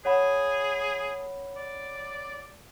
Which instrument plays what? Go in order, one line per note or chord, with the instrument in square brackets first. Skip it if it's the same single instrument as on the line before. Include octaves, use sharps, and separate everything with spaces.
[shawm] G#4 [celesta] C#5 F#5 B5
[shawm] D5